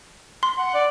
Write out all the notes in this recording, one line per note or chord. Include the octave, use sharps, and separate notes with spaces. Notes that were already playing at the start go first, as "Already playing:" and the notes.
C6
F#5
D5